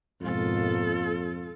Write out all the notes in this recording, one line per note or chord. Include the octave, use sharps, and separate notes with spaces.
F2 G#2 B2 A#3 F4 A4